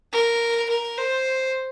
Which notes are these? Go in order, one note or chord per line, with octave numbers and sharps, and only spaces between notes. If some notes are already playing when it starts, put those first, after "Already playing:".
A#4
A#4
C5